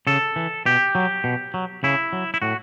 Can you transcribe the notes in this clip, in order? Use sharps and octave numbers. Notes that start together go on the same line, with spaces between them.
C#3 A4
E3
B2 G4
F#3
B2
F#3
C#3 E4
F#3
E4
A2 F#4